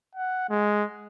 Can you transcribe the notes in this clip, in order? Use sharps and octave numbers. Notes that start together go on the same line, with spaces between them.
F#5
G#3